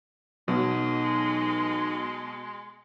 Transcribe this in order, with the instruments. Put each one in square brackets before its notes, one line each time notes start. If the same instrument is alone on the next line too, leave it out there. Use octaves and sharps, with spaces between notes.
[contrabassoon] B1 [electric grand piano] B2 [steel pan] F#3 B3 [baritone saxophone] G#3